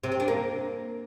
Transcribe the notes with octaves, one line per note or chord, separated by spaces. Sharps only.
C3
C4
D4
A#3